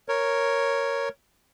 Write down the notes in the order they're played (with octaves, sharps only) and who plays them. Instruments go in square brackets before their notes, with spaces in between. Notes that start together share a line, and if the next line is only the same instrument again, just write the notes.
[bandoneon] A#4 C#5